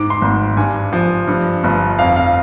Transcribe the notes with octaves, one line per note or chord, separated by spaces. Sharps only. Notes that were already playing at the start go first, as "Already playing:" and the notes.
Already playing: G#2 D6
C6
G#1
G2 G#5
F3
G2
G1
F2 F5
F5